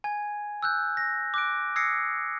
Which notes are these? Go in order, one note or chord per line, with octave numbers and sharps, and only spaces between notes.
G#5 G#6
E6 F#6 G6
A#6
D6 F#6 D7
D#6 E6 G#6 A#6 C7 C#7